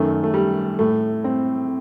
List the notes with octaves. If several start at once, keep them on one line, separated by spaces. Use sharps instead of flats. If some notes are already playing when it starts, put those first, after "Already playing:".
Already playing: F#2 D#3 A3
A3
G3
A2 A3
C4